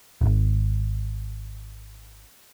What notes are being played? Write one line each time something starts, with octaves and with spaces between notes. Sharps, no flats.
D#1 G#1